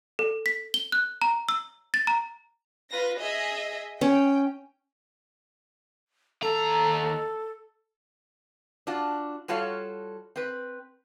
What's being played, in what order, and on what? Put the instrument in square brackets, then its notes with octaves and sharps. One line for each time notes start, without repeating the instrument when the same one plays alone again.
[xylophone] A4
B6
G7
F#6
A#5
E6
A6
A#5
[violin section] F4 B4 A#6
G#4 D#5 E5
[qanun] C#4 [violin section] G5
[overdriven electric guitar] D#2 A#5 [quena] A4
[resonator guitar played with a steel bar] D4 F4 F#4
G3 F4 F#4 A4 C#5 F5
C4 B4